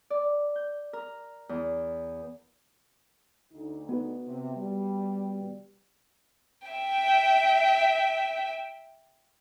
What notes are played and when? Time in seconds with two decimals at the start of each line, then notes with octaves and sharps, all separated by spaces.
0.10 D5
0.56 G6
0.93 A#4
1.49 E2
3.52 D2 D3 D#4
3.89 B3 F#4 B4
4.27 C3
4.56 G3
6.68 E5 G5